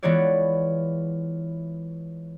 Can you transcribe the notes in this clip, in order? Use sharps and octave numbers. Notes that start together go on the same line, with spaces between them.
E3 G#3 B3 F4 C#5 D5